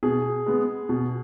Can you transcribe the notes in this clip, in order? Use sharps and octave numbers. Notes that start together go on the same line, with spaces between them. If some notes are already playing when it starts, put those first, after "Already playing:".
B2 G#4
G#3 B3
B2